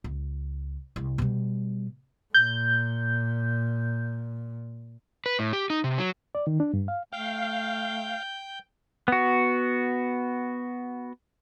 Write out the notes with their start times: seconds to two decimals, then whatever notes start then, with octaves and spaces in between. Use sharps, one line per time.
0.04 C#2
0.96 C2
1.18 B2 G3
2.34 A#2 G6
5.26 B4
5.39 A2
5.53 G4
5.70 D#4
5.84 C3
5.98 F#3
6.35 D5
6.47 D#3
6.60 D4
6.74 G2
6.88 F5
7.13 A3 F5 G5 G6
9.08 B3 F#4